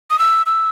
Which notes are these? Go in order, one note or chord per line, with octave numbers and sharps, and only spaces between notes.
D#6
E6
E6